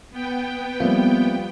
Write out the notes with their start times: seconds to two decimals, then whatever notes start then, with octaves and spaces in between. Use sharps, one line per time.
0.11 B3 G5
0.80 F3 G3 A#3 C4 E5